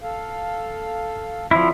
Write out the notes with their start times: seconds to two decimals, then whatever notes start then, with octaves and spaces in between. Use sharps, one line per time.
0.01 A4 F5
1.51 D3 F3 F#3 C4 E4